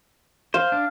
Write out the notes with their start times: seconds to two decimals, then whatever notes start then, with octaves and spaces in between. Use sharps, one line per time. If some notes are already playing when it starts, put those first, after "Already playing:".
0.54 C5 F5
0.72 D4